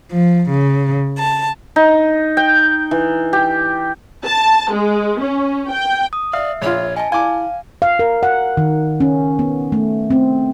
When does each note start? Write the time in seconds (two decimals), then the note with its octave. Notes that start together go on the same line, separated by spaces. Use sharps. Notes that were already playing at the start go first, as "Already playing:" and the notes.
0.12 F3
0.48 C#3
1.19 A5
1.76 D#4
2.37 G5
2.91 E3
3.33 G4
4.24 A5
4.71 G#3
5.21 C#4
5.71 G5
6.13 D#6
6.33 D5 E5 F5
6.62 A#1 F4 C#5
6.97 D#5 G#5 A5
7.12 E4 F5 G#5 D6
7.82 F5
7.99 A#4
8.23 F#5
8.57 D#3
9.00 C#4
9.39 B3
9.72 A3
10.10 C4